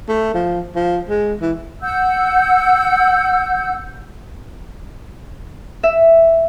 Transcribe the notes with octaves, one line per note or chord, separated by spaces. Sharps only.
A3
F3
F3
G#3
E3
F#5 E6 G6
E5